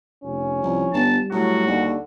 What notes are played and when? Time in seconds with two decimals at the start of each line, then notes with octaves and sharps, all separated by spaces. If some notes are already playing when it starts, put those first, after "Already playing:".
0.23 F1 C#4
0.62 C2 F3
0.93 G1 G3 A5
1.31 A2 F#3 F#4
1.67 D#2 D3